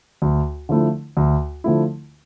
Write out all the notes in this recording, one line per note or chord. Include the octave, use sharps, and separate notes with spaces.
D2
D3 F3 A3 E4
D2
D3 F3 A3 E4